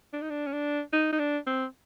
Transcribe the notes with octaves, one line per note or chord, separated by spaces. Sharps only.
D4
D#4
D4
C#4
D4
D#4
D#4
D4
C4